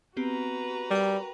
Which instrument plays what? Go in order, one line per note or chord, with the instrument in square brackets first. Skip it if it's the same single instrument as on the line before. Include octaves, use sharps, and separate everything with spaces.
[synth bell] B3 C4 G4 [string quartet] F#4 B4 A#5
[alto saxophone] G3 [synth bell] A#4 G5